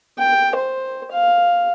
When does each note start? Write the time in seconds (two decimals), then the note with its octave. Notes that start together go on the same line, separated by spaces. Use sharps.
0.19 G5
0.55 C5
1.11 F5